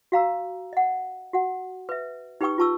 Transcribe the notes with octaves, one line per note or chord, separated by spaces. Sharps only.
F#4 F5 A#5 E6
D#5 F#5
F#4 F#5
B4 E5
D#4 G4 B4 G5 C#6 D#6
F4 B4 A5 C#6 E6